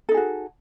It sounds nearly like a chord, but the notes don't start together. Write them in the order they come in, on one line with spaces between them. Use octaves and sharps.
A4 D#4 G#4 F#4